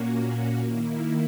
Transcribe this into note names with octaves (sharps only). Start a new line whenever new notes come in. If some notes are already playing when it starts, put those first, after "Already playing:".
Already playing: A#2 A#3 C#4 F#4
D#3 A#3 E4